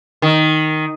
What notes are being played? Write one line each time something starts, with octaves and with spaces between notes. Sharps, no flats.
D#3